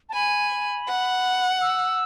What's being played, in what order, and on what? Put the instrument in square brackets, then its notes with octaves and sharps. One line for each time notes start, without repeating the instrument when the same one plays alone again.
[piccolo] A5
[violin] G#5 [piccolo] B5
[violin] F#5
[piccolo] E6